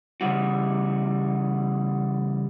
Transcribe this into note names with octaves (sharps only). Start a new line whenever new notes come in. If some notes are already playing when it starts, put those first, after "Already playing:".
C#3 E3 G3 F#4